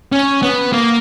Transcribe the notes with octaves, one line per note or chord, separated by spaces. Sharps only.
C#4
B3
A#3